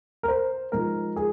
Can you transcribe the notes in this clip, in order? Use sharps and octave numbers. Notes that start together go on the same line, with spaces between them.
A#4
C5
G#2 F3 A#4
G#4